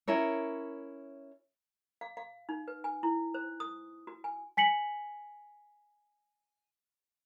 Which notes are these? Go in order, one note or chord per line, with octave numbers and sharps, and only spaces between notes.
C#4 E4 A#4 C#5
F5
F5
D#4
B4
G#5
E4
C5
D#6
F#4
G#5
G#5 B6 C#7 F#7